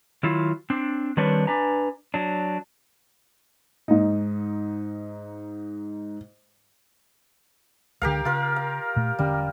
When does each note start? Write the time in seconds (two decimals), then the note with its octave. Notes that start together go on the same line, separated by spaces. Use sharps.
0.23 D#3 F#3 E4 F4
0.70 C4 D4
1.17 D#3 G3 C4 D4 B4 C#5
1.47 D4 B4 G#5 A#5
2.14 F#3 D4
3.88 G#2 D#4
8.02 C#2 D3 G4 A#4 F5
8.25 C#3 F4 A#4
8.56 F5
8.96 A#2 A3
9.19 E1 D3 G3 C#4